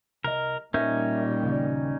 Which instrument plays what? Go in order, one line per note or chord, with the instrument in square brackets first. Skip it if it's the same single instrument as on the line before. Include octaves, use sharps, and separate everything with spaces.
[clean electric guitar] C2 D#5 [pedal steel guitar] A#4
[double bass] A#2 G3 [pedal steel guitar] C#4 D#4 [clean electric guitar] A#4 E5
[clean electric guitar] D#2 C#3 D5